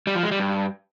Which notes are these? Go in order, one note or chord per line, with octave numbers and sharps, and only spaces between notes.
G3
F3
G#3
G3
G2